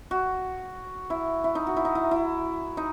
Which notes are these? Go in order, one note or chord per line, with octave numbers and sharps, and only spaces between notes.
F#4
E4
E4
D#4
F#4
E4
D#4
E4
E4
D#4